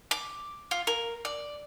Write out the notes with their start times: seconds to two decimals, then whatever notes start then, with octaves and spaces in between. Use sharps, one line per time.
0.11 D6
0.71 F4
0.87 A#4
1.25 D5